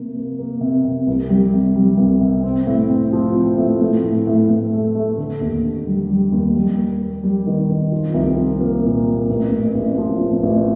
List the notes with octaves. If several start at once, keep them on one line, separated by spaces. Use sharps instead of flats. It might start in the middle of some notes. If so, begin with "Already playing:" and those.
Already playing: C3 A#3
A#3
A#3
C3
C3
C2
G3
C3
G3
C2
C3
C4
A2
C4
F3
C4
A2
A2
A2
A2
A2
A3
A3
D3
D#2
D3
G3
G3
D#2
G3
A#3
A#3
G3
D#3
D#3
F3
C2
F3
A#3
A#2
A#3
A1
A1
A1
F3
A1
A1